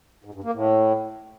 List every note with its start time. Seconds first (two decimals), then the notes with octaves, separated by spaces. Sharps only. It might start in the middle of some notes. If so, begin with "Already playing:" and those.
0.25 G#2
0.34 G2
0.44 A#3
0.54 A2